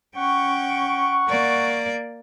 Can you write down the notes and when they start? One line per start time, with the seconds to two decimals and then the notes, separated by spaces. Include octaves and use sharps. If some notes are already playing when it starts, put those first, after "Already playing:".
0.16 C#4 F#5 G5 C#6
1.28 A#3 D5